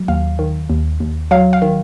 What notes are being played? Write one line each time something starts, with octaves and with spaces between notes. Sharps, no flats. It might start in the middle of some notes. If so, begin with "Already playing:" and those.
Already playing: F#3
D#2 F5
D#3
D#2
D#2
F#3 F5
F5
D#3